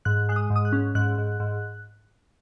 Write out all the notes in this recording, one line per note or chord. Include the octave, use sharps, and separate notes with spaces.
G#2 F#6
G#3 F#6
D#6
G#2
D#6
F#6
C#4
G#2 F#6
G#2
G#2